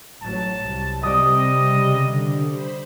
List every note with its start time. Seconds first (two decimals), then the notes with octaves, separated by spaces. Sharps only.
0.22 A1 F#3 A5
0.62 C2
1.03 C3 G3 C4 D5 D#5 D#6
1.62 C#3
2.01 D3
2.44 C5 B5